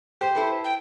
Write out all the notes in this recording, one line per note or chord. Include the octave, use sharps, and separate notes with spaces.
G4 C5
E4 A4 B4
G5